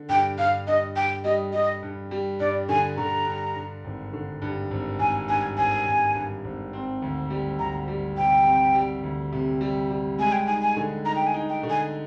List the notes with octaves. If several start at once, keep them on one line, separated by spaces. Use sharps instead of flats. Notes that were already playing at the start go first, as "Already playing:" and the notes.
Already playing: D3
G2 G5
G2 F5
G2 D#5
G2 G5
G3 D#5
G3 D#5
G2
G3
G2 D5
D3 G#5
D3 A#5
G2
G2
G#1
D3
G2
G#1
G#1 G#5
G2 G#5
G#1 G#5
G#1
G2
G#1
C4
D2
G3
D2 A#5
G3
C3 G5
C4
G3
D2
C3
G3
G3
G#3 G#5
G5
D#4 G#5
G#5
D3
D#4 A#5
G5
G#5
D#4
G5
D3
G#5